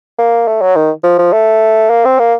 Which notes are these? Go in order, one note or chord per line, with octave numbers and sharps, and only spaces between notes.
A#3
A3
F#3
D#3
F3
F3
A3
A#3
C4
A#3